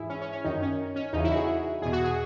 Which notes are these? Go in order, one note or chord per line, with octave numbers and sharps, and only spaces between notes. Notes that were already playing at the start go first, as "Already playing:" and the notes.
Already playing: G#2 E3 E4 G#4
C#4
C#4
C#4
F#2 D#3 D#4
C#4
C#4
E2 C#3 E3 D#4
E4
F#4
G#4
E2 B2 G#4
F#4
G#4